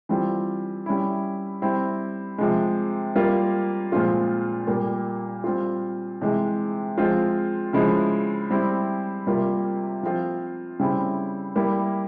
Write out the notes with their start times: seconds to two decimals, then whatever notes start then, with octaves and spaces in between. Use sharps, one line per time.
0.09 E3 G3 C4 F4
0.86 G3 C#4 E4
1.62 G3 C4 E4
2.38 C3 F3 G#3
3.15 G3 A#3 F4
3.92 A#2 F3 G#3 C4 F4
4.67 A#2 G3 A#3
5.44 G3 C4 F4
6.21 C3 E3 G#3
6.98 F3 G#3 C4 F4
7.73 C#3 F3 G#3 E4
8.50 G3 C4 E4
9.27 C3 G3 A#3 F4
10.03 F3 C4 F4
10.79 C#3 G3 C4 E4
11.56 G3 A#3 E4